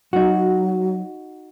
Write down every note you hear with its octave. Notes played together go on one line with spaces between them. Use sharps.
F#3 D#4 F#4